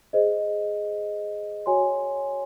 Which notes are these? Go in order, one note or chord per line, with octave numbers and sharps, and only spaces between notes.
G#4 C5 D#5
F#4 C#5 G#5 C6